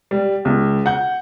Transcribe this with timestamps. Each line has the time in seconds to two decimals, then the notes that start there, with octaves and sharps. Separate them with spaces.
0.11 G3
0.45 C#2
0.86 F#5 G6